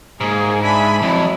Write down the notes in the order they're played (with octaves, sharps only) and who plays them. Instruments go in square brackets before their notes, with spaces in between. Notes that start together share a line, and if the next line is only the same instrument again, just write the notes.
[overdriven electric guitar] G#2 [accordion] A#3 [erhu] G#4
[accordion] D4 E5 G#5 [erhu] B5
[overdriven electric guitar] F2 [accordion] F#3 E4